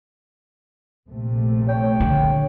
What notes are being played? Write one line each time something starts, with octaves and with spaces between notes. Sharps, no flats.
A#1 C3 A3
C#5 G5
D3